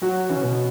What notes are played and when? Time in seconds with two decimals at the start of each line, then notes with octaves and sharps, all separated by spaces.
0.02 F#3 F#4
0.29 E3 C#4
0.36 C#3
0.43 B2